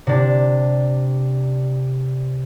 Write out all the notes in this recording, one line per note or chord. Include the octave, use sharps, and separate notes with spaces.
C3 D4